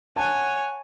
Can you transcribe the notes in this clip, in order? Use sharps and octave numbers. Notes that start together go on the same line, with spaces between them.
C#5 F#5 G#5 A5